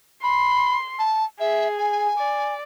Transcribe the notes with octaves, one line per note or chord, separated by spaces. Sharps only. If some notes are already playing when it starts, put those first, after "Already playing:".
B5 C6
A5
G#4 E5
G#5
D5